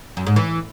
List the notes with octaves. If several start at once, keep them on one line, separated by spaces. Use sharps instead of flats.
F#2
G#2
E3